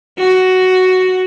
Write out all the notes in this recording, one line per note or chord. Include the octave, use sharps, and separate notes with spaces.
F#4